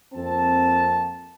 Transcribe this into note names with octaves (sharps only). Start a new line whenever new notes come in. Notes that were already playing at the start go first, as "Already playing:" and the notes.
F2 A#3 C4 A5